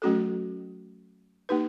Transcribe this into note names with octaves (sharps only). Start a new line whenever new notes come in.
F#3 A3 C#4 F#4 A4
A#3 D#4 G4 B4